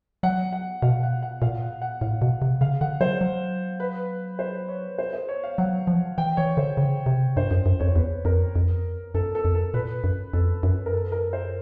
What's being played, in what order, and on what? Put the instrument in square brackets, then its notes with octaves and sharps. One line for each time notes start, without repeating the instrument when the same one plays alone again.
[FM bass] F#3 [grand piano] F#5
[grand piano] F#5
[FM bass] B2 [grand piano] F5
[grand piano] F#5
F#5
[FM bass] A#2 [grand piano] F5
[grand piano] F#5
F#5
[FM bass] A2 [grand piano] F5
[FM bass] B2
C3
[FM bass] C#3 [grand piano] F5
[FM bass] D3 [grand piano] F#5
[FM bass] F#3 [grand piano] C5
[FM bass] F#3
[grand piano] B4
C5
C#5
C5
C5
C#5
F5
[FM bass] F#3 [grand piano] F#5
[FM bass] F3
[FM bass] E3 [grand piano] G5
[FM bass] E3 [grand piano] C#5
[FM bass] D3 [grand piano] C5
[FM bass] C#3
C3
[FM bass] G2 [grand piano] C5
[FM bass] F#2
F#2
[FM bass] F2 [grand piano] C#5
[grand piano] C5
[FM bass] E2 [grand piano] B4
[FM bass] F2 [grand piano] A#4
[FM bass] F2
[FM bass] F#2 [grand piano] A4
[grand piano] A4
[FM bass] F2
[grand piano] A4
[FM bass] A#2 [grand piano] B4
[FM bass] F#2
[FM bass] F2 [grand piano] A4
[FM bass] F#2
[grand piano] A#4
A4
A#4
C5